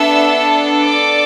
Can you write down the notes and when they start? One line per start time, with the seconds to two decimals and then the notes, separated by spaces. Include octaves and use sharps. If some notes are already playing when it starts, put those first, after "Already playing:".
Already playing: B3 D4 A4 E5 E6
0.83 D5 D6